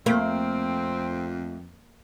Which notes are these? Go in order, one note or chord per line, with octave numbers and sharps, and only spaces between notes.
F2 A3 A#3 C4